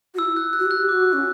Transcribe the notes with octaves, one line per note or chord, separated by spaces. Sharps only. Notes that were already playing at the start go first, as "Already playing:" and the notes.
F#4
E4 E6
F#6
F#6
F#4
G4 F#6
F#4 D6
C#4